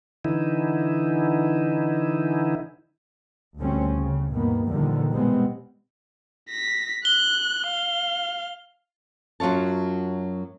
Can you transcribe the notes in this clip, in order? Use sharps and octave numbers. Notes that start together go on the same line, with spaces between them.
D3 E3 D#4 E4
D2 D3 G3 C4 C#4
C#3
G2 B2 D#3 A#3 B3
E2 A#2 D3 D#3 F3 G3
B2 E3 G3 G#3 B3 C4
A#6 B6
F#6 G7
F5
F#2 F#3 F4 C#5 A5